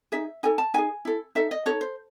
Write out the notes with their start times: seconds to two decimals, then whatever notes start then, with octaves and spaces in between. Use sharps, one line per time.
0.12 D#4 G#4 E5
0.43 D#4 A4 G#5
0.58 A5
0.74 D#4 G#4 G#5
1.05 E4 A4
1.35 D#4 A4 E5
1.51 D#5
1.66 D#4 F#4 A4 C#5
1.81 C5